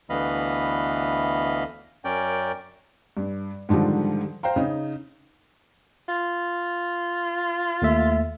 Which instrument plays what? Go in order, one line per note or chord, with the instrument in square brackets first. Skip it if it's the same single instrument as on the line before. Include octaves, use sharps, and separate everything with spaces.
[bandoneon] D2 E3 B3 D#5 F5 B5
F#2 C#4 A#4 D5 G5
[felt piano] G2
G#2 D3 D#3 F3 G3
C5 F5 G5 A#5
C#3 D#4
[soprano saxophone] F4
[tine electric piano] D#2 A3 E5